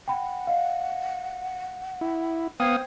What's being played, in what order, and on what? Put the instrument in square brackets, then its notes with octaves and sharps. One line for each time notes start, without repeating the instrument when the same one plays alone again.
[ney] F#5 [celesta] G5 B5
[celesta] D#5 F5
[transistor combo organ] E4
[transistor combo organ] B3 F5 D#6 [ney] C5 [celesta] G5 G#6 C7